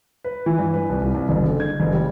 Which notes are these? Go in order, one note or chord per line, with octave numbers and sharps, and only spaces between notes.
B4
E3
G2
B4
C2
C2
C2
F#1
D3
G#6
F#1
G3